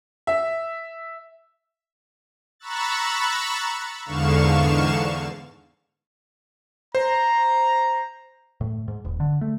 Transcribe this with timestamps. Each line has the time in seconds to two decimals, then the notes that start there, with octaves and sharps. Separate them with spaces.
0.27 E5
2.59 A#5 B5 C#6 E6 F#6 A6
4.04 E2 G#2 D3 F5 C#6 E7
6.95 C5 A#5
8.61 A2
8.88 G#2
9.05 D#1
9.20 D3
9.41 A3